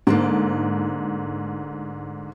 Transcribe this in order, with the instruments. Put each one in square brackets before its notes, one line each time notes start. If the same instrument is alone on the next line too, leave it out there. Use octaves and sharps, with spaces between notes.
[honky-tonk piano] G#2 [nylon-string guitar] D3 A3 A#3